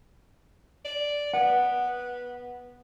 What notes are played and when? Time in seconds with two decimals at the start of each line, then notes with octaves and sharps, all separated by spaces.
0.85 D5
1.34 B3 F#5